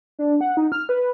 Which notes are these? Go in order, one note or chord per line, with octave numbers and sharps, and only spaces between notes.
D4
F#5
D#4
F6
B4